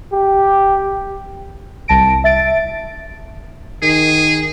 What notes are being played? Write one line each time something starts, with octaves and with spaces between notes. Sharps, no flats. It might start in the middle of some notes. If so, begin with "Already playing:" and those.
G4
C2 A5 A#6 D7
E5 A6 D7
D#3 G#4